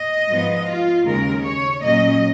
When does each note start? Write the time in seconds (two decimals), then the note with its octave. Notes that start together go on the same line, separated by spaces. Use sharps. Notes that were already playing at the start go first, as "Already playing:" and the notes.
Already playing: D#5
0.28 G#2 F3 B3
0.67 F4
1.06 D#2 C#3 G#3 A#4
1.44 C#5
1.84 A#2 F#3 A#3 C#4 D#5